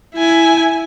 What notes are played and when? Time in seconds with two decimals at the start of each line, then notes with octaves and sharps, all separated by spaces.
0.15 E4 G#5